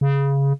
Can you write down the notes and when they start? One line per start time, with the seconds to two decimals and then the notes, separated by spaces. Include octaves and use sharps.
0.01 C#3